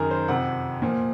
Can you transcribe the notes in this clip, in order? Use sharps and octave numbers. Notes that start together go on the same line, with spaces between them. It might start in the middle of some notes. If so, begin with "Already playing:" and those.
Already playing: F#2 D#3 G#4 A#4
C5
F2 C3 F3 F#5
A#2 F3